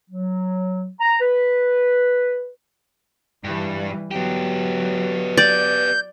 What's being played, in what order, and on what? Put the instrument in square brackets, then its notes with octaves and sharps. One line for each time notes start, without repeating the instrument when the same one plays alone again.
[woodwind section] F#3
A#5
B4
[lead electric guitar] G2 [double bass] E3 G3
[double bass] F#3 [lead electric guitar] B3 G4
[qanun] D5 [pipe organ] G6